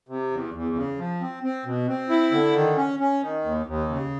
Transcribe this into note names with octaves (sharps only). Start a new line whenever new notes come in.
C3
E2
E2
C#3
F3
C4
C4
B2
C4
E4
D3
D#3
C#4
C#4
D#3
D#2
D#2
C#3